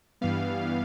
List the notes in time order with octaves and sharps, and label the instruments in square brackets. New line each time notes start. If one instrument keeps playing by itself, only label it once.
[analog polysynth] G2 E3 G3 B3 F5